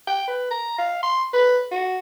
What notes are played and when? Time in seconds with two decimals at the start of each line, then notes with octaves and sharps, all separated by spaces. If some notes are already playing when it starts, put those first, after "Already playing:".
0.07 G5
0.27 B4
0.50 A#5
0.78 F5
1.03 C6
1.33 B4
1.71 F#4